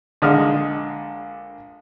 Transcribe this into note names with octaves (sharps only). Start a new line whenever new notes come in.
A#1 D3 G#3 D#5 D#6 F6